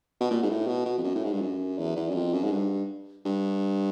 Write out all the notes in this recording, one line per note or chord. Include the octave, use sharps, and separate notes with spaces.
B2
A#2
G#2
A2
B2
B2
F2
F#2
A2
G#2
G2
F#2
E2
E2
F#2
F2
F#2
G#2
G2
G2